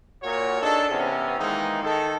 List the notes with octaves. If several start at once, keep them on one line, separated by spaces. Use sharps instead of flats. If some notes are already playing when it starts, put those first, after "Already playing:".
A#2 F#4 A#4 C#5
D4 D#4 G#4 A4
C3 E3 B3 C#4
D#3 E3 G#3 A#3 D#4
D#3 A4